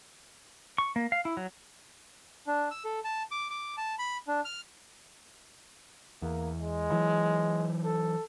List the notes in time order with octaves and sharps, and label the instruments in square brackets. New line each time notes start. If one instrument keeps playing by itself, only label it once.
[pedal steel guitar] C#6
A#3
F5
E4
F#3
[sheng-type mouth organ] D4
E6
A4
A5
D6
D6
A5
B5
D4
F6
[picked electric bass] E2 [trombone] A#3
[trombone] G#3
[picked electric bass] E3 F#3
[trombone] A4